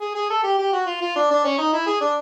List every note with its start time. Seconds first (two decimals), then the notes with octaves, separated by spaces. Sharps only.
0.01 G#4
0.15 G#4
0.30 A4
0.44 G4
0.59 G4
0.73 F#4
0.87 F4
1.01 F4
1.16 D4
1.31 D4
1.44 C#4
1.58 D#4
1.73 E4
1.87 G#4
2.01 D4